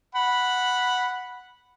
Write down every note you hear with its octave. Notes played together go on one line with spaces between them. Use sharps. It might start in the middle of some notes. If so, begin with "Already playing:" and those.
F#5 B5